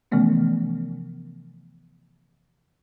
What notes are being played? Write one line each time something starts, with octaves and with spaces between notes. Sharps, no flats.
C3 E3 F3 A3 B3 C#4